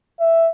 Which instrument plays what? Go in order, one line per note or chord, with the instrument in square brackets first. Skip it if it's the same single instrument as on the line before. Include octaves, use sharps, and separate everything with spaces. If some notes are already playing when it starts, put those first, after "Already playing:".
[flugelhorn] E5